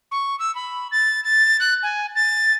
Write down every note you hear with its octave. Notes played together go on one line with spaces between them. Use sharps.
C#6
E6
B5
A6
A6
F#6
G#5
A6